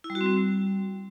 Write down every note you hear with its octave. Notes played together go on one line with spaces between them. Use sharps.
E4
G3
F#4
C4
G3